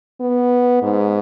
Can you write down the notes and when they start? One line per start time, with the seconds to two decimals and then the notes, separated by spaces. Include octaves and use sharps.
0.20 B3
0.83 G#2